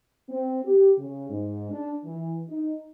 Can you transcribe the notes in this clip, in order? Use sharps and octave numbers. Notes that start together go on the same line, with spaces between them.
C4
G4
C#3
G#2
D4
E3
D#4